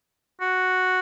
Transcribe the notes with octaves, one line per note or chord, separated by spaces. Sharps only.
F#4